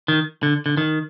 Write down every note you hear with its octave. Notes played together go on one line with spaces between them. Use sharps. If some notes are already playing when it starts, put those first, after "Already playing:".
D#3
D3
D3
D#3